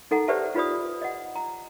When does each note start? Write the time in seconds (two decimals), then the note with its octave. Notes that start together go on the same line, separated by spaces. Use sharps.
0.11 D#4 A4 F#5 A#5
0.28 G4 B4 C5 D5 E5 A5
0.55 D#4 F4 B4 D5 B5 D#6
1.02 D#5 F#5
1.36 A#5